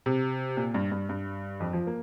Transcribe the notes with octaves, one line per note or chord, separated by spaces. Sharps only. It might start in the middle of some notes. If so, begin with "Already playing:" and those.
C3
A#2
G2
G2
G2
F2
F3
A#3